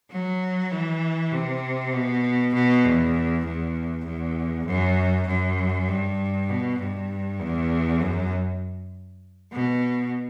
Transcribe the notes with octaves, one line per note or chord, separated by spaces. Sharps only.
F#3
E3
C3
B2
B2
E2
E2
E2
F#2
F#2
G2
B2
G2
E2
F#2
B2